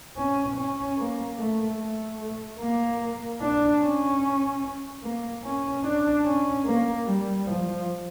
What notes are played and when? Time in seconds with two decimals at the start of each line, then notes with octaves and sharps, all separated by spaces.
0.17 C#4
0.57 C#4
0.98 A#3
1.39 A3
1.79 A3
2.60 A#3
3.41 D4
3.81 C#4
5.03 A#3
5.44 C#4
5.84 D4
6.25 C#4
6.66 A#3
7.06 G3
7.47 F3